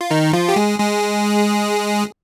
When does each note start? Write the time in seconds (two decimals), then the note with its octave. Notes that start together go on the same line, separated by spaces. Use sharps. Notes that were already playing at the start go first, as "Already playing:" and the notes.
0.01 F4
0.11 D#3 D#4
0.33 F3 F4
0.49 G4
0.56 G#3 G#4
0.79 G#3 G#4